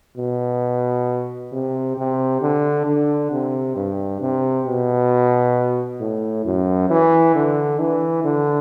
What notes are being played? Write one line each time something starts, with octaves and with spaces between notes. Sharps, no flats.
B2
C3
C3
D3
D3
C3
G2
C3
B2
A2
F#2
E3
D3
E3
D3